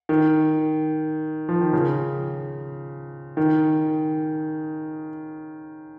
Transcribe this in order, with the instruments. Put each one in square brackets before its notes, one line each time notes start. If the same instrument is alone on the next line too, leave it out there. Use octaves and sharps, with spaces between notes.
[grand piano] D#3
F3
D#3
C#3
D#3